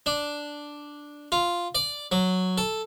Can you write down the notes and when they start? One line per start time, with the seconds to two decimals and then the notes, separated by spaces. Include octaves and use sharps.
0.06 D4
1.32 F4
1.75 D5
2.12 F#3
2.58 A4